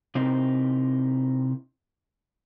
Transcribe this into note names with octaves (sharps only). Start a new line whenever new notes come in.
C3 C4 D#4 E4 A#4